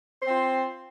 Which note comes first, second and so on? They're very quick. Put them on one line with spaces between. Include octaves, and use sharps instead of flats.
C5 C4 F4